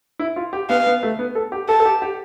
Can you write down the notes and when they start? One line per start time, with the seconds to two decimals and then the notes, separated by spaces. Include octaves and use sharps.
0.19 E4
0.36 F4
0.53 G4
0.70 B3 F5
0.86 B3
1.03 A3
1.19 B3
1.35 A4
1.52 G4
1.69 A4 A5
1.80 A4
1.85 G4
2.02 G4